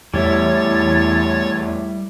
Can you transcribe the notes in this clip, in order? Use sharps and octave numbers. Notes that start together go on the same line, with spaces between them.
E2 A2 G3 E4 C#5 A6